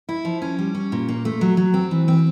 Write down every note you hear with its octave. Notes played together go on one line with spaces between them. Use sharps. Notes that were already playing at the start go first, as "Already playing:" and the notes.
E4
F3
C#4
G3
C#4
A#2
A#3
A3
F#3
F#3
C4
E3
C4